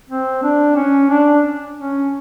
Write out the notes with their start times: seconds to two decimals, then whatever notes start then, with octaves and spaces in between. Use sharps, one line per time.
0.09 C4
0.43 D4
0.76 C#4
1.10 D4
1.78 C#4